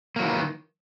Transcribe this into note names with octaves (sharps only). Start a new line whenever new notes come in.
D#3 E3 F#3 A#3